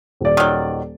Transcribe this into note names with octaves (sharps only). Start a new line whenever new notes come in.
D#1 D5
D#3 F#3